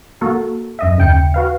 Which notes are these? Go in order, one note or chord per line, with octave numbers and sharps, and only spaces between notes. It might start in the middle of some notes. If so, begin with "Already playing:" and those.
A#3 F#4 A4 A#4
F#2 D#5 E5
D#2 C#3 G5 C#7
F#4 B4 F5